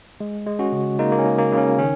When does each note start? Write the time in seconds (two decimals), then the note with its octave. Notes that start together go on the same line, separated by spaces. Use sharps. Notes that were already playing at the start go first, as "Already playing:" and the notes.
0.20 G#3
0.47 G#3
0.59 C#4 F#4
0.73 C#3
0.99 G#3 A#3 D#4
1.12 A#3
1.19 C#4
1.25 C#3
1.38 A#3
1.52 C#3
1.58 C#4
1.78 D#3 C#4